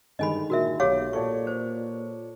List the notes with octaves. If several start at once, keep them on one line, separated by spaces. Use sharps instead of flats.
G2 D3 D#3 G#3 D#5 G#5 B5
A#2 F#4 A#4 E5
B1 G4 C#5 F5 D6
A#2 A4 C#5 D5 C#6
C5